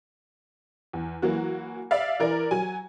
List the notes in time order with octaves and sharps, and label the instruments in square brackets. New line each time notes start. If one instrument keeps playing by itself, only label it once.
[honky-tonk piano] E2
E3 F#3 A#3 F#4
D5 E5 F5
E3 A#4 D5
F#3 G#5